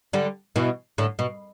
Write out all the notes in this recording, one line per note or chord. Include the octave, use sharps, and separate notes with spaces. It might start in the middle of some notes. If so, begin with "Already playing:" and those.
D3 G3
B2 E3
A2 D3
B2